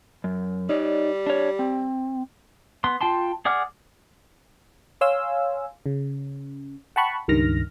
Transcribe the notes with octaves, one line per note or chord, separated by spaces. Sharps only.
F#2
G3 D#4 C#5 D5
D4 C#5
C4
B3 C6
F4 G5 A5 C6
G#4 D5 F#5 D6 F6
C#5 F5 G#5 C6 E6
C#3
F#5 G5 A5 B5 C#6 F#6
C#2 G2 D#3 F6 A#6